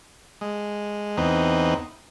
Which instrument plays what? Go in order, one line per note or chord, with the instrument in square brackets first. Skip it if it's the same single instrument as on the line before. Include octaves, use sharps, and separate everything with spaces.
[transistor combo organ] G#3
E2 C4 D#4 B4